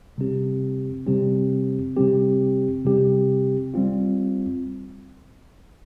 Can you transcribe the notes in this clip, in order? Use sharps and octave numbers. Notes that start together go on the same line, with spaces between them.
C3 G3 C4 G4
C3 G3 C4 G4
C3 G3 C4 G4
C3 G3 C4 G4
G3 C4 F4